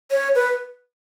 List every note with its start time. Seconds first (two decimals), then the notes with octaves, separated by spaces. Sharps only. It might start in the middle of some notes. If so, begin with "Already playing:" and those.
0.11 C#5
0.35 B4